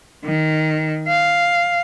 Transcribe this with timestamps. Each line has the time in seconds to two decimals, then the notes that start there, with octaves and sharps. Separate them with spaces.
0.25 D#3
1.08 F5